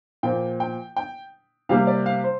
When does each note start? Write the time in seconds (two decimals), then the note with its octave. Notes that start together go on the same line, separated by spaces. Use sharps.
0.23 A#2 F3 A#3 G5
0.60 G5
0.96 G5
1.69 C3 G3 A#3 F5
1.87 D5
2.06 F5
2.24 C5